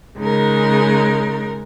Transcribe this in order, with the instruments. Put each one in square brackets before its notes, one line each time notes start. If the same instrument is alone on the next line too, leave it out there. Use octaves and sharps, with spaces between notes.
[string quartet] C#3 G#3 D#4 A#4